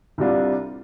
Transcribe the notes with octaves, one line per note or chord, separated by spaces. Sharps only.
C2 C3 G3 D4 F4